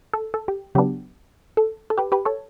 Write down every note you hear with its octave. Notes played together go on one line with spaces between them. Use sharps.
A4
A4
G4
C#3 F#3 B3 D4 G4
A4
A4
G4 B4
G4 B4
A4 C#5